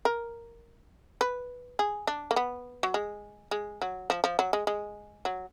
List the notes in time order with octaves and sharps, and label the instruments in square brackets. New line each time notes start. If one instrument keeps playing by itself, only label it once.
[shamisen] A#4
B4
G#4
D4
A#3
B3
F#3
G#3
G#3
F#3
F3
F3
F#3
G#3
G#3
F#3